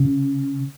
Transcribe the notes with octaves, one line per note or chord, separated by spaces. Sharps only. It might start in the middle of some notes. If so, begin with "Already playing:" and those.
Already playing: C#3